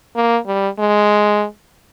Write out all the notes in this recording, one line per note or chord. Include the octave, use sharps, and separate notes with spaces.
A#3
G3
G#3